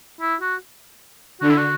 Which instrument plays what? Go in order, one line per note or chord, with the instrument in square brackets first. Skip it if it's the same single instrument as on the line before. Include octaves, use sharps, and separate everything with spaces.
[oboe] E4
F#4
[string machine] D3 [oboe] F#4
[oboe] E4
F#4